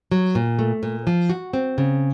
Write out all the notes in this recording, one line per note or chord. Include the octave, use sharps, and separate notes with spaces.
F#3
A#2
A3
A#2
F3
F#4
C4
C#3